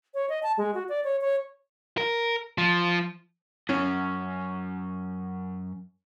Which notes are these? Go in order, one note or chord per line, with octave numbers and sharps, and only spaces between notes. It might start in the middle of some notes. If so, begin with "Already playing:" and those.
C#5
D#5
A5
G#3
F#4
D5
C#5
C#5
A#4
F3
F#2 C#4